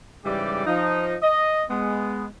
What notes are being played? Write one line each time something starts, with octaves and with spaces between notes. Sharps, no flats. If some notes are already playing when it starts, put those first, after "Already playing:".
G#2 C#3 E3 G3 G4 D5
F3 D#4
D#5
G#3 B3